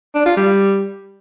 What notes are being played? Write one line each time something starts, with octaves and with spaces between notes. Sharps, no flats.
D4
F4
G3